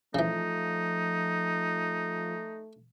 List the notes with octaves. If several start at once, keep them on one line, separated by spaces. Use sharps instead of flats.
C#3 E3 F3 A3 D#4